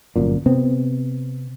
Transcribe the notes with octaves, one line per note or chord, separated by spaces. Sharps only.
G1 F#2 A#2
C3 B3 C4